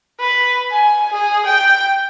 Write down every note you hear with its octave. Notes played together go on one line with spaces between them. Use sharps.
B4
G#5
G#4
G5